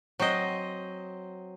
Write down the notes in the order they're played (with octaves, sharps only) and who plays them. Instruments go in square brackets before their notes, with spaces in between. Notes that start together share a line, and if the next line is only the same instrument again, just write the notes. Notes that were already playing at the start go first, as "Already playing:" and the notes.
[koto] F#3 C4 C5 D#5